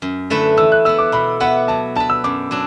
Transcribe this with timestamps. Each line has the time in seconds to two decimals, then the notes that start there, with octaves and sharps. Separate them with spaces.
0.02 F#2
0.30 D3 A3 E4 B4
0.57 E3 E6
0.72 F#6
0.85 B3 E4 E6
0.98 D6
1.12 B2 B5
1.40 B3 E4 B4 F#5
1.68 F#3 A5
1.95 D4 B4 A5
2.10 E6
2.24 F#2 D6
2.51 F#3 D4